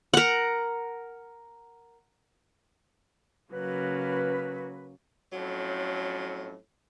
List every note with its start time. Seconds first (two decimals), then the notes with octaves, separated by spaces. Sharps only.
0.14 A#4 F#5
3.53 C#3 F#3 A#3 B4
5.32 F2 A2 F#3 C#4